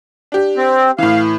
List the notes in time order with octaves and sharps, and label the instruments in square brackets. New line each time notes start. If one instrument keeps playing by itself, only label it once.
[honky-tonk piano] D4 G4
[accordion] C4
[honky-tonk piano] A2 E3 [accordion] F5